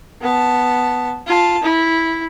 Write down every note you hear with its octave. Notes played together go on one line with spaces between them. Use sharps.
B3 A5
F4 A5
E4